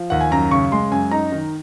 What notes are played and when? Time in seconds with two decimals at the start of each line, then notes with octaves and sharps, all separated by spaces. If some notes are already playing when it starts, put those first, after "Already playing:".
Already playing: F3
0.10 D#2 F#5
0.21 G#5
0.31 F#2 A#5
0.51 C#3 C#6
0.72 G#3 C6
0.91 F#2 G#5
1.11 D#4 A#5
1.32 D#3